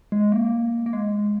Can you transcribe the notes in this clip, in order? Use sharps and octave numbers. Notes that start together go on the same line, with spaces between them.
G#3
A#3
A#3
G#3